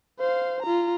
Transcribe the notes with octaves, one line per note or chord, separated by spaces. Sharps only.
C5 F5
F4 A#5